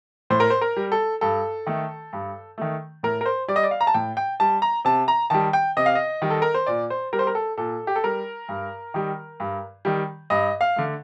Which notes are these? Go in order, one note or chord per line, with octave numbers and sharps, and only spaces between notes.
A2 C5
A#4
C5
A#4
G3
A4
G2 A4
D#3 A3
G2
D#3 A3
A2 A#4
A#4
C5
G3 D5
D#5
D5
F5
A#5
A5
A2 G5
G5
G3 A5
A#5
C3 A5
A#5
D#3 G3 A5
G5
C3 D#5
F5
D#5
D#3 G3
A4
A#4
C5
A#2 D5
C5
G3 A#4
C5
A#4
A4
A#2 A4
G4
A4
G3 A#4
G2
D#3 G3
G2
D#3 G3
G2 D#5
F5
D3 A3